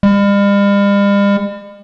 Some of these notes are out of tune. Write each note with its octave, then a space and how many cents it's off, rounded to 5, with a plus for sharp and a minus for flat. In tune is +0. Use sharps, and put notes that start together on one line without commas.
G3 +45